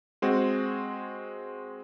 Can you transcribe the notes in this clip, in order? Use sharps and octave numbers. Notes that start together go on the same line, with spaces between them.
G#3 C4 F#4 G#4